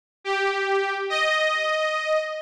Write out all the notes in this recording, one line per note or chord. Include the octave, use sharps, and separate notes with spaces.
G4
D#5